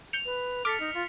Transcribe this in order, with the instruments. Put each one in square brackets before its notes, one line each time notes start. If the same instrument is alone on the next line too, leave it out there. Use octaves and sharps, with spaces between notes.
[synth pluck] G6 C#7 [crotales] F7
[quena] B4
[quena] A4 [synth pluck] D6 [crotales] F6 B6 C#7
[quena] D#4
F4